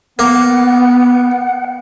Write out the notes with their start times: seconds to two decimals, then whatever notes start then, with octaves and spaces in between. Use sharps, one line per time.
0.19 A#3 B3 F#5